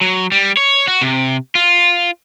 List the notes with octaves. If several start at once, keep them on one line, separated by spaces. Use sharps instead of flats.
F#3
G3
C#5
F#4
C3
F4